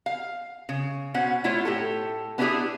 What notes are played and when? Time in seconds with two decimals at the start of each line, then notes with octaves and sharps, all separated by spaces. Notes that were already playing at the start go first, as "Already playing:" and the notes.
0.06 F5
0.69 C#3
1.14 B2 C#4 C5 F#5
1.44 A3 E4 F4 C5 C#5
1.65 A2 G4 A4
2.38 B3 C#4 D4 E4 G4 G#4